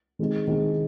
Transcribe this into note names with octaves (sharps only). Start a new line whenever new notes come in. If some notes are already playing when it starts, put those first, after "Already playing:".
D#3 G#3 C4 D#4 G#4
D#3 G#3 C4 D#4 G#4